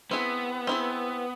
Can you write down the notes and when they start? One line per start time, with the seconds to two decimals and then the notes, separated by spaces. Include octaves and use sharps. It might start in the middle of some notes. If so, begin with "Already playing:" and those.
0.11 B3 C4 E4 G#4
0.67 C4 E4 G#4